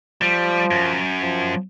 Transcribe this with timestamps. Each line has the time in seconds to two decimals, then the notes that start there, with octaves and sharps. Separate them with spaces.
0.22 F3 G3
0.71 F#2
1.22 F3